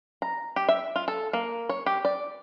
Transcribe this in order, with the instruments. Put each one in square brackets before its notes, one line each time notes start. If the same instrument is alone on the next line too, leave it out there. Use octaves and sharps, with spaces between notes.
[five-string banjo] A#5
G4
E5
F4
A4
A#3
C#5
G4
D5